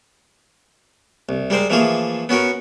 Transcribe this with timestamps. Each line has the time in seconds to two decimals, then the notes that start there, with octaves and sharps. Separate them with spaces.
1.29 C2
1.50 G3 G#3 A#4 C5
1.70 E3 F3 A3 A#3 G#4
2.29 B3 C#4 F#4 A#4